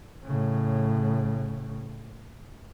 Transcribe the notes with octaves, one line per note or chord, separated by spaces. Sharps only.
A2 C#3